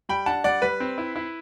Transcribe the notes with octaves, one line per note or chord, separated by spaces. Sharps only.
G3 G5 B5
D4 F#5 A5
G3 D5 F#5
G3 B4
C4
E4
E4